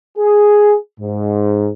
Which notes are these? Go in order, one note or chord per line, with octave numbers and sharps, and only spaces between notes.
G#4
G#2